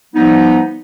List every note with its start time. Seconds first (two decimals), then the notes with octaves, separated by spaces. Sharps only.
0.14 F3 G3 B3 D#4